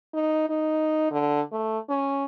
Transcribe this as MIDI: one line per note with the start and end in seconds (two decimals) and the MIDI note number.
0.14 0.48 63
0.49 1.10 63
1.11 1.41 50
1.52 1.79 57
1.89 2.25 61